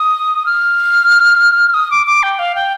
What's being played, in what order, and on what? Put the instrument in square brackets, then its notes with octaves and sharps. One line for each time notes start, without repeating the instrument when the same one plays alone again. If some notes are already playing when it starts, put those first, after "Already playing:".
Already playing: [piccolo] D#6
F6
D#6
D6
D6
G5
F5
G5